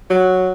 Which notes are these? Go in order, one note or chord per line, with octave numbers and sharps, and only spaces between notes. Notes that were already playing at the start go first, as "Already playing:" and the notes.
F#3